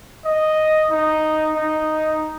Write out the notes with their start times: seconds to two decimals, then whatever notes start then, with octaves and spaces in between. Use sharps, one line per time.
0.25 D#5
0.91 D#4
1.56 D#4